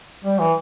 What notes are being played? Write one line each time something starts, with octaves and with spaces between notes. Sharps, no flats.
G3
E3